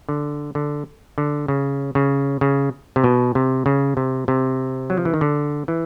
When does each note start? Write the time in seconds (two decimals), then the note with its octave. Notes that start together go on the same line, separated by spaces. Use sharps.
0.09 D3
0.55 D3
1.18 D3
1.48 C#3
1.95 C#3
2.41 C#3
2.96 C3
3.04 B2
3.35 C3
3.66 C#3
3.97 C3
4.28 C3
4.90 F#3
4.97 F3
5.05 E3
5.14 D#3
5.21 D3
5.68 E3